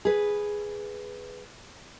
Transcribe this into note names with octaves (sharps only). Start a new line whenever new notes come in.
G#4 B4